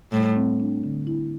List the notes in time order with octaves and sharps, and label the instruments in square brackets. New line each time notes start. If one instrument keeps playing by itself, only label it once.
[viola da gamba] A2 [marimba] G3
[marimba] C4
D4
D3
E4